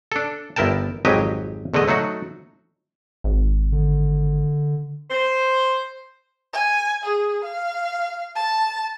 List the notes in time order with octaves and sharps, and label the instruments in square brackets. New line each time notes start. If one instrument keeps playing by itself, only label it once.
[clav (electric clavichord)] D4 A4
G1 E4 A#4 G5 A5
G#1 F2 F#3 G4 D#5 G#5
E2 D3 A3 D#5
F#3 A3 D#4 F#4
[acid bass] G#1
[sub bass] D3
[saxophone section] C5
[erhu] G#5
G#4
F5
A5